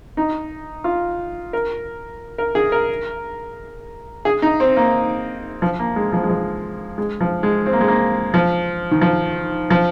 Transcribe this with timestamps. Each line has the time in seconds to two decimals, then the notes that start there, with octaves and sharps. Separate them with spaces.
0.17 D#4
0.84 F4
1.53 A#4
2.38 A#4
2.55 G#4
2.72 A#4
4.25 G#4
4.42 D#4
4.60 C4
4.77 A#3
5.62 F3
5.79 A#3
5.96 G#3
6.13 F3
6.23 G#3
6.29 F3
6.98 G#3
7.21 F3
7.43 G#3
7.66 C4
7.73 A#3
7.81 G#3
7.88 A#3
8.34 F3
8.91 D#3
9.01 F3
9.70 F3